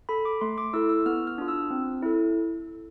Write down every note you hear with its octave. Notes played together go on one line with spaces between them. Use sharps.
A4 B5
D6
A3 C6
D6
E4 A4 E6
E6
B3 F6
F6
D4 F4
E6
C4
E4 A4